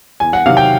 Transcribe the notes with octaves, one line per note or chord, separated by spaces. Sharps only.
E2 G#5
F#5
C3 D#3 F#3 F5
G5